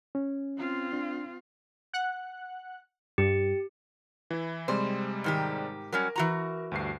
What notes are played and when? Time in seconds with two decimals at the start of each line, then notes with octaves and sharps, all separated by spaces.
0.15 C#4
0.57 C4 F4
0.93 D4
1.94 F#5 F#6
3.18 G2 G4
4.31 E3 E4
4.68 C3 G3 G#3 C5
5.24 G#2 D#3 G4
5.92 F#3 G3 C#4 A#4
6.16 E3 F#4 A#5
6.72 D2 G2 C7